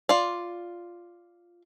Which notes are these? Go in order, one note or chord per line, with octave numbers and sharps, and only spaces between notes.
F4 D5